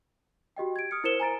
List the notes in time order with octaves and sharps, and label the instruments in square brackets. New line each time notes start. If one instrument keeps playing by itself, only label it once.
[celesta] F#4 G4 D#5 G5
G#6 D7
D#6 F6 C#7
E4 A#4 C5 C#7 E7 G7
G#5 A#5 A6 D7